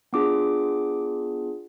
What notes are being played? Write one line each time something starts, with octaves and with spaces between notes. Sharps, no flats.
B3 D4 F4 G#4 D6